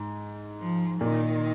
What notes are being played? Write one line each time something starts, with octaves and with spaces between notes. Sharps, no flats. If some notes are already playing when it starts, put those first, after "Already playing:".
Already playing: G#2
F3
A#2 D#3